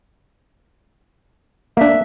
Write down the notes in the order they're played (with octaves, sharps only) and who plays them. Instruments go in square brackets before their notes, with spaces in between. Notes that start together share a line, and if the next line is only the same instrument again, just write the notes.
[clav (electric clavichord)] A#3 D4 [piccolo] E5